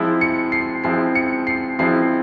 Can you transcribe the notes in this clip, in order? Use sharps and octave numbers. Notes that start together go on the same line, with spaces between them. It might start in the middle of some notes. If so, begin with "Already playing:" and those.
Already playing: F3 G#3 C4 E4
C#7
C7
F3 G#3 C4 E4 C7
C#7
C7
F3 G#3 C4 E4 C7